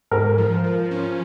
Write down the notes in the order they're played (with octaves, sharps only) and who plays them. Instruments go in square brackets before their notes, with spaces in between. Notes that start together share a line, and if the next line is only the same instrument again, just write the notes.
[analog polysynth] G#2 [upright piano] A#4
[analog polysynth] F3
F3
C#4